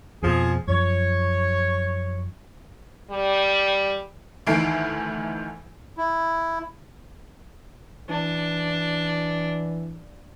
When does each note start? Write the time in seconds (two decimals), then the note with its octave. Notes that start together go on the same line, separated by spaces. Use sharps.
0.23 F2 B2 F3 G#4
0.67 F#2 F3 C#5
3.11 G3
4.47 D2 D#3 E3 A3 C7 D7
5.97 E4
8.09 E3 D4